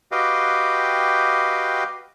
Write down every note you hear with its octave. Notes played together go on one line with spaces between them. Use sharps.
F#4 G4 B4 D#5 F5 G5